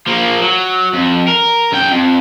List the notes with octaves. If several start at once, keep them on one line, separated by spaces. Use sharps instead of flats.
F3 A#3
F#3
F2
A#4
F#2 G5
F2